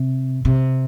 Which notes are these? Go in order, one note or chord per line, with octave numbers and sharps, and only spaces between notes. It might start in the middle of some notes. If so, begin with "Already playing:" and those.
Already playing: C3
C3